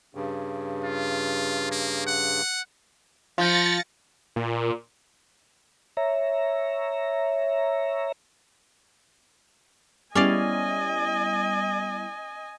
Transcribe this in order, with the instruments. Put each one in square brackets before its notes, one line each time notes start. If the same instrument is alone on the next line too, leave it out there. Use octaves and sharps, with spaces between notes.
[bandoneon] G2 C#3
[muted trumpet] F4
A#3
F#5
[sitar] F3 [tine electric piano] F4 G6 [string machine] A6 A#6 C#7
[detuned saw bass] A#2
[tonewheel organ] C#5 E5 A#5
[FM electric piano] G3 B3 E4 [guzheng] C#4 D5 F5 [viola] D#5 G#5